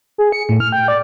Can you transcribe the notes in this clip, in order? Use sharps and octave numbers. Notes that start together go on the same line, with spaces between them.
G#4
C#7
A2
F6
G5
D5